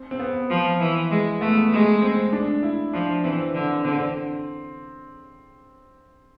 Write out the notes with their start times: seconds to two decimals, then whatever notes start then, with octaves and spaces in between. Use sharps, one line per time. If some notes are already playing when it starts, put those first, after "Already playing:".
Already playing: C4
0.11 C4
0.19 B3
0.50 F3
0.80 E3
1.11 G#3
1.41 A3 B3
1.72 G#3
2.02 C4
2.33 D4
2.63 E4
2.93 F3 D4
3.24 E3 C4
3.54 D3
3.85 D3 C4